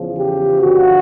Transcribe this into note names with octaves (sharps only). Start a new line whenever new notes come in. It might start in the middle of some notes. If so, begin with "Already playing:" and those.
Already playing: E2 C#3 F3
G4
G2 D3 F3 F#4